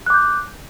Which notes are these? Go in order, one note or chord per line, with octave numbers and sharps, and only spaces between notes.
D6 F#6 G6